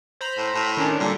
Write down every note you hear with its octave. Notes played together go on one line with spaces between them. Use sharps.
C5 A#5 B5
A2
A2
D#3 C#4 D4
A#2 D3 G3